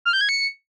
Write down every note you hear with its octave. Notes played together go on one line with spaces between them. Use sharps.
F6
G6
G#6
C#7